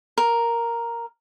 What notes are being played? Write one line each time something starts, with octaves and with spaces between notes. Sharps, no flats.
A#4